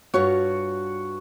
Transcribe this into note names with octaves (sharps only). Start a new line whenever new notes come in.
G2 F4 F#4 C#5